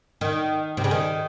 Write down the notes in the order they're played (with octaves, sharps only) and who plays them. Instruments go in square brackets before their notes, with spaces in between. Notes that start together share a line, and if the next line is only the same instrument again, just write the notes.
[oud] D#3
C3
C#3
D#3